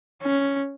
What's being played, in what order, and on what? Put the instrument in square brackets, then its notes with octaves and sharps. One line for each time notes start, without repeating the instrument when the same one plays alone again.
[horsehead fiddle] C#4